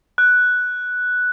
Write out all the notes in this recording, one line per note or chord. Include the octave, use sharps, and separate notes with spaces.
F#6